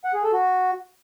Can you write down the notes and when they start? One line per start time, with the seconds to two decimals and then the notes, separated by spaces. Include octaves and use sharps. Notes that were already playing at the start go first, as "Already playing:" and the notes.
0.05 F#5
0.14 G#4
0.23 A4
0.33 F#4